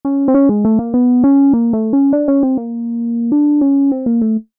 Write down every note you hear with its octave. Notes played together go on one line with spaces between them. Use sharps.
C#4
C4
C#4
G#3
A3
A#3
B3
C#4
A#3
A3
C#4
D4
C#4
C4
A#3
D4
C#4
C4
A#3
A3